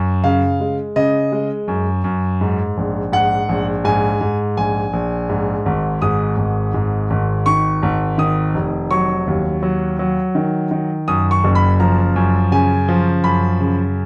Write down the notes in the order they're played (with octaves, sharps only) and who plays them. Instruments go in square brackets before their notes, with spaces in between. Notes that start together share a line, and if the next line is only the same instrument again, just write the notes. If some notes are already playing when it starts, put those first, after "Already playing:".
Already playing: [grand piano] F#2
C#3 F5
G#3
C#3 D#5
G#3
F#2
F#2
G#2
A#1
G#2 F#5
A#1
G#2 G#5
G#2
A#1 G#5
A#1
G#2
G#1
G#2 D#6
G#1
G#2
G#1
D#3 C#6
G#1
D#3 D#6
F1
F#3 C#6
D#2
F#3
F#3
D#3
D#3
F#2 D#6
C#6
F#1
B5
F3 A#5
F#2
C#3 G#5
F3
F#2 B5
C#3